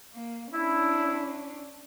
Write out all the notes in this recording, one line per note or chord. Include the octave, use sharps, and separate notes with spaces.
A#3
C#4 D4 E4